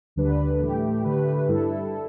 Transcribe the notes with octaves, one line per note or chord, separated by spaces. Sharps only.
D2 D3 G3 D4 B4
A2 E3 A3 G4
D3 A3 G4 B4
G2 G3 E4 A4